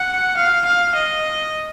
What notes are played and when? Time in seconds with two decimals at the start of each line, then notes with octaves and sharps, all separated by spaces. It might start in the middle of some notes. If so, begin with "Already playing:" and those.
Already playing: F#5
0.37 F5
0.66 F5
0.95 D#5